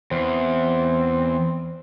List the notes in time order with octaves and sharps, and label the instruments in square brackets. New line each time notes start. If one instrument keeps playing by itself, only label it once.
[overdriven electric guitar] E2 [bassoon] C4